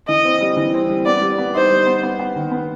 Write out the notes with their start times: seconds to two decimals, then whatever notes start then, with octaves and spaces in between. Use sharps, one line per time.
0.08 E3 D#5
0.25 C4
0.41 G3
0.57 E3
0.74 C4
0.90 G3
1.06 B3 D5
1.22 G3
1.38 B3
1.55 D#4 C5
1.71 G3
1.87 B3
2.03 B3
2.19 B3
2.36 D#3
2.52 B3